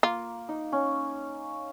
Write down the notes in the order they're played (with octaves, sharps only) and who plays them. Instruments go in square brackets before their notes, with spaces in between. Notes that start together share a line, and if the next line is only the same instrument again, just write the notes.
[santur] A#3 [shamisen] F4
[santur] D#4
C#4